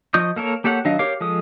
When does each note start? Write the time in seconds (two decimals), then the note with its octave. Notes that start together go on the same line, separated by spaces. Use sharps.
0.14 F3 D#5 C#6 D#6 G6
0.36 A#3 A4 A#4 C#5
0.64 A#3 G4 A4 C#5 F#5
0.85 D#3 F#3 D4 D#5 F5
0.99 G4 A#4 C#5 F5 D6
1.21 F3 G#3 A4 D#6